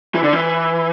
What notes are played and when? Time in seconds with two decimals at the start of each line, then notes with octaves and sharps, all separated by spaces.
0.15 E3
0.23 D3
0.33 E3